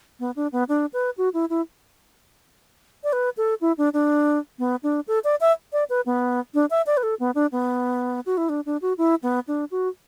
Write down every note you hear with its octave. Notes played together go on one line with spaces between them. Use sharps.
B3
D4
B3
D4
B4
F#4
E4
E4
D5
B4
A4
E4
D4
D4
B3
D4
A4
D5
E5
D5
B4
B3
D4
E5
D5
B4
A4
B3
D4
B3
F#4
E4
D4
D4
F#4
E4
B3
D4
F#4